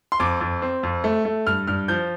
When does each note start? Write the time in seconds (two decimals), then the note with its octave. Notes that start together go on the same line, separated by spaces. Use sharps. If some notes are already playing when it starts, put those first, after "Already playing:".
0.12 C6
0.20 F2 D6
0.41 F2
0.62 C4
0.83 F2
1.04 A3
1.25 A3
1.47 G2 F6
1.67 G2 F6
1.88 F3 G6